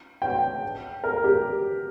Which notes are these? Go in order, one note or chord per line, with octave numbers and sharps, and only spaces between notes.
G5
A#4
G4